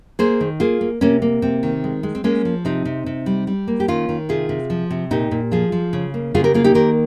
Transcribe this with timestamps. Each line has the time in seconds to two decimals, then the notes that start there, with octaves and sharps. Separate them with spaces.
0.19 A#3 G#4 C5
0.41 D#3
0.60 A#3 F4 G#4
0.81 A#3
1.01 C3 A#3 C#4
1.22 A#3
1.42 C3 C4
1.63 D#3
1.84 G#3
2.03 G#3
2.15 C4
2.24 G#3 A#3 C#4
2.45 F3
2.65 C3 C4 D#4
2.85 C3
3.06 C3
3.26 G3
3.47 G3
3.68 A#3
3.80 G4
3.88 D#3 C#4 F4
4.09 D#3
4.29 C3 F4 G#4
4.49 C3
4.70 F3
4.91 C3
5.11 A#2 D#4 G4
5.31 A#2
5.52 F3 F4 G#4
5.72 F3
5.93 C#3
6.14 A#3
6.34 C#3 F4 G#4
6.44 G4 A#4
6.54 A#3 F4 G#4
6.64 D#4 G4
6.75 D#3 G4 A#4